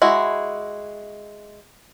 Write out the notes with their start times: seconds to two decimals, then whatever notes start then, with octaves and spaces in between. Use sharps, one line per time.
0.02 G#3 E4 F#4